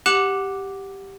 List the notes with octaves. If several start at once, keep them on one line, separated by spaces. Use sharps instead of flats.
G4 F#5 D6 F#6 E7 F#7